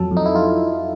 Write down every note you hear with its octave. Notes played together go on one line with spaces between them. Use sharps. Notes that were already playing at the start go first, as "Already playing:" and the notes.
Already playing: F2 F#3 A4
F2
D#4
E4
F4